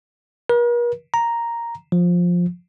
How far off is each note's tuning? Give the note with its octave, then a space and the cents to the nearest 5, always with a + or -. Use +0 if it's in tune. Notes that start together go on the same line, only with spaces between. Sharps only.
A#4 +45
A#5 +0
F3 +10